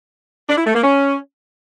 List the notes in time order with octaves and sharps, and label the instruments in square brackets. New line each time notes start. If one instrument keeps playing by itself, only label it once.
[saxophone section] D4
E4
A3
A#3
C#4